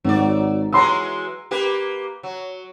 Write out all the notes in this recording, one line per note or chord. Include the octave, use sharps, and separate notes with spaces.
G#1 F#3 D5
E3 F#3 G#3 A#5 C6 E6
A#3 G4 B4
F#3